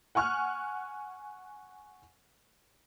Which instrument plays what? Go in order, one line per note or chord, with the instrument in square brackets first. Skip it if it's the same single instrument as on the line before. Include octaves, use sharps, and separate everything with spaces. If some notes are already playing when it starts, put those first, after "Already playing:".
[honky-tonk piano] F#5 G#5 C#6 F6 F#6